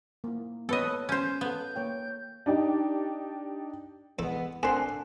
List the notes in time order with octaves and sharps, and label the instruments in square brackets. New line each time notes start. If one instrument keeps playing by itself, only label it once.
[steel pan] A#3 E4
[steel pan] B3 B4 C#5 [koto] A4 D#5
[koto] C#4 C5 [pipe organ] G6
[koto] B3 [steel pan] A4 F5
[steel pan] A#3 C#5 G5
[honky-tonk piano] D4 D#4 G4
[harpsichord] E2 A4 [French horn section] G#3 B3
[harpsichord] A#2 C4 [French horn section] D4 [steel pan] A4 F#5 C6 [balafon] G#5